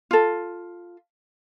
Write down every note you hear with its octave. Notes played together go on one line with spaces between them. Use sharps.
F4 A4